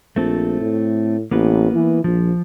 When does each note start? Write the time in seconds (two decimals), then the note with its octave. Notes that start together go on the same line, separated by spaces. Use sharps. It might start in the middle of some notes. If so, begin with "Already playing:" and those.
0.16 A#1 A3 C4 A4
0.61 A2
1.31 A1 A#3 B3 B4
1.74 E3
2.04 A#1 F3